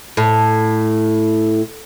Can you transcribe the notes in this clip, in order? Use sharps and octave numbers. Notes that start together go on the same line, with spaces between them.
A2